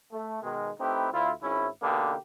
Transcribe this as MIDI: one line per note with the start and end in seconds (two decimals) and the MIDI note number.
0.11 0.38 57
0.41 0.69 47
0.41 0.69 51
0.41 0.69 56
0.78 1.07 57
0.78 1.07 60
0.78 1.07 63
0.78 1.07 64
0.78 1.07 67
0.78 1.07 71
1.11 1.30 38
1.11 1.30 64
1.11 1.30 65
1.41 1.67 32
1.41 1.67 44
1.41 1.67 61
1.41 1.67 64
1.81 2.13 47
1.81 2.13 50
1.81 2.13 58
1.81 2.13 63
1.81 2.13 67
1.81 2.13 71